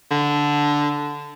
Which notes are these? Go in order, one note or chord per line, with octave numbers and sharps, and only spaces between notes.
D3